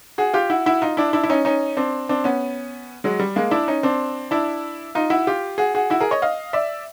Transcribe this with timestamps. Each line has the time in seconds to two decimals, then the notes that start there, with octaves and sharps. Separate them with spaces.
0.18 F#4 G#4
0.34 F4 G4
0.50 E4 F#4
0.66 E4 F#4
0.82 D#4 F4
0.97 D4 E4
1.13 D4 E4
1.23 E4
1.30 C#4 D#4
1.45 C#4 D#4
1.77 C4 D4
2.09 C4 D4
2.24 B3 C#4
3.04 F#3 G#3
3.19 G3
3.36 G#3 A#3
3.51 D4 E4
3.68 C#4 D#4
3.83 C4 D4
4.31 D4 E4
4.95 D#4 F4
5.10 E4 F#4
5.27 F4 G4
5.58 F#4 G#4
5.75 F#4 G#4
5.90 E4 F#4
6.00 G#4 A#4
6.11 C#5 D#5
6.22 D#5 F5
6.53 D5 E5